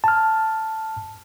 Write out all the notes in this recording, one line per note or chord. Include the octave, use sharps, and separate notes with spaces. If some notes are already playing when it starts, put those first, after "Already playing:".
A5 F6